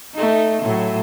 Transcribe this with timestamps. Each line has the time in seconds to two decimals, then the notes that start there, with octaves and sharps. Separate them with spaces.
0.14 A3 D#4
0.62 A2 F#3